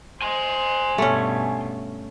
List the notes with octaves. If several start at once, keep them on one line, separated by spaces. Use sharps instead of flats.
C5 G#5 C6
G2 B2 A3 C#4